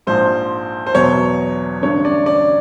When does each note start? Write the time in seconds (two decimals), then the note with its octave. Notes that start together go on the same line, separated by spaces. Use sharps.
0.07 A#1 G#2 F3 C5
0.86 C5
0.94 E2 B2 F#3 C#5
1.82 A1 G2 D3 C#5
2.05 D5
2.26 D5